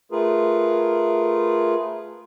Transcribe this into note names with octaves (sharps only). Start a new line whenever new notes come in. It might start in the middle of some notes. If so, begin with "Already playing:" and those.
A3 F4 G#4 A#4 B4